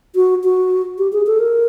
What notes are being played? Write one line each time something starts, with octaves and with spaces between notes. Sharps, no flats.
F#4
F#4
G4
G#4
A4
A#4